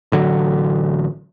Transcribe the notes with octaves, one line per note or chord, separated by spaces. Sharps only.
A1 D3 F#3